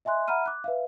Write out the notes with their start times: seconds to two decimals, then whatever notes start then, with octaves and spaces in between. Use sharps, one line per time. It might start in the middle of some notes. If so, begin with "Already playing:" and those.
0.05 D#5 E5 G#5 C6 F#6
0.28 E5 F#5 A#5 B5 F6 D#7
0.46 D6 F#6
0.64 B4 E5 F5